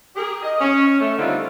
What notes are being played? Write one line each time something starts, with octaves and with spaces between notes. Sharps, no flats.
G4 G#4 A#4
D#5
C#4
A3
D3 D#3 G3 C4 D#4 F4